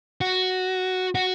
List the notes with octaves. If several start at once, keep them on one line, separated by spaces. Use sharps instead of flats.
F#4
F#4